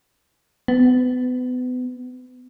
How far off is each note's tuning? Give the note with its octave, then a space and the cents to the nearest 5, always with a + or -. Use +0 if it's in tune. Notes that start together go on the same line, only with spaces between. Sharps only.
B3 +30